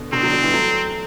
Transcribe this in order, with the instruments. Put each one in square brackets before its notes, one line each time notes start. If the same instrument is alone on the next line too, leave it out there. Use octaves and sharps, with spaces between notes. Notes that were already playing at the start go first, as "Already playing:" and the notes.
Already playing: [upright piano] B2 D3
[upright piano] B2 D3 [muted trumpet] C4
[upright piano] D3 F#3
D3 F#3
E3 G3
F#3 A3